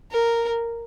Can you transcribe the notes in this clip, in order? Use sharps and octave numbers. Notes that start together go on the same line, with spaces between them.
A#4